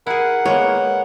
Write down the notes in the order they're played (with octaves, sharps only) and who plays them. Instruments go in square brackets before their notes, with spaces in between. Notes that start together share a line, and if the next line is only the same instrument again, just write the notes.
[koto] E4 G#4 [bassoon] A#4 [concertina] F#5
[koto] G#3 A#3 B3 [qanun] C#5